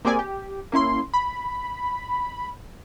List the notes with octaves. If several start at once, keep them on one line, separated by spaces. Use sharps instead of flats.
A#3 C4 G4 G#4 D5 G#5
G4
A#3 C#4 E4 C6
B5